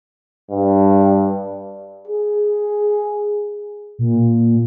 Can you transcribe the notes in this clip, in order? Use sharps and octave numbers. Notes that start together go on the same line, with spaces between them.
G2
G#4
A#2